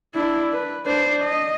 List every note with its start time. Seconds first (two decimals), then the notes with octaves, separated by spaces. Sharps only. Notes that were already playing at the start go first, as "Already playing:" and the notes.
0.15 D4 E4
0.52 B4
0.86 D4 C5
1.24 D#5